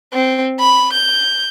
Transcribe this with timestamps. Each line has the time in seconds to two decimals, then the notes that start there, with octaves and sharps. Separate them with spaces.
0.13 C4
0.60 B5
0.94 G6